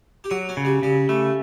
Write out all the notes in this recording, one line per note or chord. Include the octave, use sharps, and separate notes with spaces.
G4
F#3 F#4
C#4
C#3
G3
C#3 G3
G3 A3